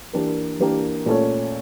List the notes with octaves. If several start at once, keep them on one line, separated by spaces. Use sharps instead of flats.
E3 A#3 D4 G4 A#4
E3 A#3 D4 G4 A#4
A#2 A3 C#4